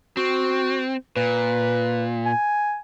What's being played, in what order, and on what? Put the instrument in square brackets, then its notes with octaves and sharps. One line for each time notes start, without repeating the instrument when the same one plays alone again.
[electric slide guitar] C4 [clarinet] F#4
[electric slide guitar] A#2 [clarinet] B4
[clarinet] G#5